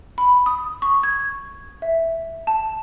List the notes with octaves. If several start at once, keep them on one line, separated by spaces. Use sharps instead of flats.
B5
D#6
C#6
G#6
E5
A5